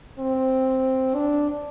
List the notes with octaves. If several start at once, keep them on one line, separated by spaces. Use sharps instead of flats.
C4
D4